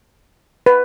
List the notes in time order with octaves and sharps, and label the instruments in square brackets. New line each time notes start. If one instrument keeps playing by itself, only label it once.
[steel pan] B4